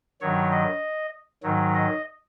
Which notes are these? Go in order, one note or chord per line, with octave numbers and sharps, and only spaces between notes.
G2 D#3 F#3 C#5
D#5
G#2 D#3 F#3
D#5